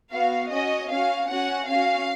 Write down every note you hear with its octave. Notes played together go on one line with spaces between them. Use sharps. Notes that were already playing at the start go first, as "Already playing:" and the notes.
B3 F#4 F5
C#4 F#4 D#5
C#4 F#4 F5
C#4 F#4 F#5
C#4 F#4 F5